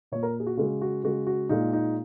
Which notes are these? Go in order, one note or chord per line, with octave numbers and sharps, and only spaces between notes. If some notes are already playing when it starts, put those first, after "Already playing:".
A#2 A#3 C#5
A#4
G#4
F#4
C#3 G#3 F#4
F#4
C#3 G#3 F#4
F#4
A#2 G#3 D#4
D#4